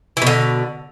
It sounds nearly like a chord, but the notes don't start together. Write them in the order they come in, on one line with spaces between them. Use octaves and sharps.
E3 B2 D3